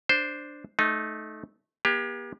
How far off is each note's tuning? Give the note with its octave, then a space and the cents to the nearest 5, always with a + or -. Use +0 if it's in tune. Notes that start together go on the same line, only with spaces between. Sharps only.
D4 +0 C5 +0
A3 -20 D#4 -5
A#3 +45 G4 +30